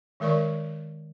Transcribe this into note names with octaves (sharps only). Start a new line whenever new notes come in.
D#3 G#3 A#4 D5 C#6